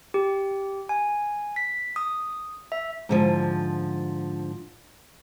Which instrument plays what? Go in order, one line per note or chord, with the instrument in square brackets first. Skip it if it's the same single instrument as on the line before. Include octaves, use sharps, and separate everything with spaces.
[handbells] G4
G#5
B6
D#6
E5
[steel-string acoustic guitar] G#2 D3 F3